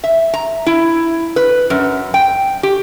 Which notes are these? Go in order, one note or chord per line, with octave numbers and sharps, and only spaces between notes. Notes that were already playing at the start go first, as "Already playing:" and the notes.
E5
A#5
E4
B4
F#2
G5
G4